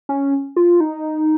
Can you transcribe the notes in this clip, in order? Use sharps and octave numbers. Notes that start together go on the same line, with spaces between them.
C#4
F4
D#4